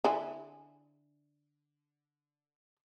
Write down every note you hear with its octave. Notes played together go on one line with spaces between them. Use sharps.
D3 E4 G#5